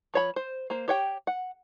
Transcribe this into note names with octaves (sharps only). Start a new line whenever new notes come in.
F3 C#5 B5
C5
A#3 C5
G4 C#5 G5
F#5